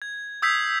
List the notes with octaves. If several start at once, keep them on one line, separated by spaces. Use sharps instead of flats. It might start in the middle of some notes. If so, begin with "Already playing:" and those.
G#6
D#6 E6 G6 G#6 B6 C7